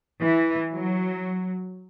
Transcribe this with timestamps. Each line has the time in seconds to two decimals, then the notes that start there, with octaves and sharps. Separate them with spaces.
0.20 E3
0.72 F#3